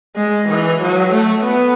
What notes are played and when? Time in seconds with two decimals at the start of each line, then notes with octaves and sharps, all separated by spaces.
0.16 G#3
0.48 E3
0.80 F#3
1.13 A3
1.43 B3